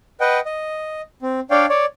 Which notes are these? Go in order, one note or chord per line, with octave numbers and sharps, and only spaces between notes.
B4 D#5 F#5 G5
D#5
C4
D4 C#5 D5 F5 G5
C#5 D5